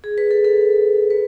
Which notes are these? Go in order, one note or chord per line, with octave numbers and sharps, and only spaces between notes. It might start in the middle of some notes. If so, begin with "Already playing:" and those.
G#4
B4
A4
A4
B4